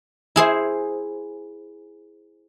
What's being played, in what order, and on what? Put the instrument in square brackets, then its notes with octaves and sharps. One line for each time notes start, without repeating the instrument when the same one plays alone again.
[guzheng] E4 G#4 C5